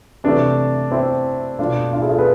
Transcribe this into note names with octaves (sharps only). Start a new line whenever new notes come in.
C3 E3 A3 D4
C4 E4
B2 A3 D4 F4
D4 F4
E4 G#4
F4 A4
G#4 B4